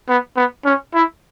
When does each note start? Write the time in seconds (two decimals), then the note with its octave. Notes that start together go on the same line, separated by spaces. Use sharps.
0.09 B3
0.37 B3
0.65 C#4
0.94 E4